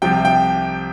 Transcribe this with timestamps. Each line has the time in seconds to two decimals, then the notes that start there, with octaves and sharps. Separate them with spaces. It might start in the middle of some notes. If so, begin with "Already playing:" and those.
0.02 C2 C3 F3 G5
0.25 G5